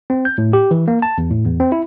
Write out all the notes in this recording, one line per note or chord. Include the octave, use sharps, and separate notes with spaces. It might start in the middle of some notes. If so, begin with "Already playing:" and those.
C4
G6
A2
G4
E3
A#3
A5
E2
A2
E2
C4
E4